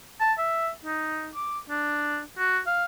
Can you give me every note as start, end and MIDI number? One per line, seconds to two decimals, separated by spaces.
0.20 0.33 81
0.38 0.70 76
0.85 1.30 63
1.35 1.59 86
1.70 2.20 62
2.38 2.59 66
2.67 2.85 77